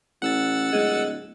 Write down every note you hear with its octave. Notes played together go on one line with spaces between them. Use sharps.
A1 F#5 E6 A6
D1 G#3